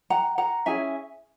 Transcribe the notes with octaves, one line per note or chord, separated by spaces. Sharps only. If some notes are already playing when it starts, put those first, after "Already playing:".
F#5 A#5
F#5 A#5
C#4 E4 G#4 E5 G#5